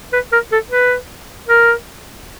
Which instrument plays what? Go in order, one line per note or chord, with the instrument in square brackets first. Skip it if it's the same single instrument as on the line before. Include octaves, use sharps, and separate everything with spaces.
[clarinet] B4
A#4
A4
B4
A#4